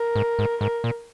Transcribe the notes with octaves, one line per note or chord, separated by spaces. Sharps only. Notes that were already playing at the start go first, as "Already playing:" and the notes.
Already playing: A#4
G#2
G#2
G#2 A#4
A#2